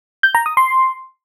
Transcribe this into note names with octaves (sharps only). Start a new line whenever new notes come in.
G6
A#5
D#6
C6